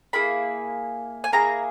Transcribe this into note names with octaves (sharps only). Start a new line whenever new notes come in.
A#3 E4 G#4 B5
G#5
A#3 E4 G#4 A#5